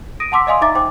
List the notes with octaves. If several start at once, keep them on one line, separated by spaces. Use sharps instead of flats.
D#6 A#6 D7 D#7
F#5 A5 C6 D6 E6 B6
D5 D#5 F5 G#5 C6 D#6
D#4 D5 E5 A#5 D6 A6
D#4 C5 G5 D6